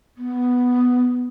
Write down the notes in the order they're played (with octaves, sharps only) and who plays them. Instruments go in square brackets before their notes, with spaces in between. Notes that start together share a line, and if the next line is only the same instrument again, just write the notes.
[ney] B3